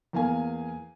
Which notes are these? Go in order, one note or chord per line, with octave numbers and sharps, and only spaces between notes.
E2 A#3 F5 G#5